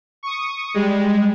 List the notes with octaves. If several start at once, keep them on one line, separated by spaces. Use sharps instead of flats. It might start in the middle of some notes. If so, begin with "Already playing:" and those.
C#6 D#6
G3 G#3